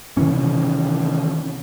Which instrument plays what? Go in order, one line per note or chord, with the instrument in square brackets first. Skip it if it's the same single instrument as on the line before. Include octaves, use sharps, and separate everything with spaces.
[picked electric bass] C3 D#3 E3 C#4